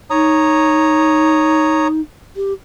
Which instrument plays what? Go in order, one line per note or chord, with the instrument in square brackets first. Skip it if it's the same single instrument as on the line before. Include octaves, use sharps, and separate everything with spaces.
[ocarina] D#4 [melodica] C#5 A#5 D#6
[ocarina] G4